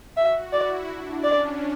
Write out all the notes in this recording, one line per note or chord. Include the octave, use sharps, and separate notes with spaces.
F#4 E5
E4 D5
D4
C#4 D5